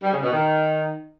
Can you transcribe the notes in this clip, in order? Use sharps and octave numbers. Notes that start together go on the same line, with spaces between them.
G3
C#3
B2
D#3